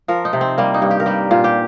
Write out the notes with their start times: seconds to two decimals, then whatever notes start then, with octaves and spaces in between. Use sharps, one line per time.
0.08 F3 A#4
0.25 D#4
0.33 C3
0.41 C4
0.58 G3 A#3
0.74 D#4
0.82 G2
0.91 G4
1.00 A#4
1.06 G3 G4
1.31 A#2 F4
1.44 G4